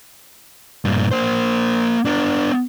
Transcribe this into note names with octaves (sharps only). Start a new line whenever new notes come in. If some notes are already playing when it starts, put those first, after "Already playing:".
G2 A#2
A#3 C5
B3 D4